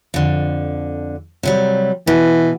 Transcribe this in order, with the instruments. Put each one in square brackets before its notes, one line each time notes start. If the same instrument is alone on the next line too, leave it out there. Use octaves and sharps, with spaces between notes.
[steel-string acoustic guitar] F2 D3
C3 F#3 G3
[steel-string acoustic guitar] B2 [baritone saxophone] E3